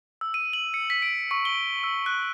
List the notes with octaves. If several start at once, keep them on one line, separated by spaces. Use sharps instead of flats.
E6
D#7
F#7
C#7
B6
D7
C#6
G7
E6
F#6